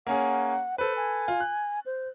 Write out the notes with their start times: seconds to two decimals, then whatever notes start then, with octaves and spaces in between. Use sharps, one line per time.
0.07 A#3 C#4 G#4 F#5
0.78 A4 B4 C5
0.96 G#5
1.28 F4
1.40 F#6
1.86 C5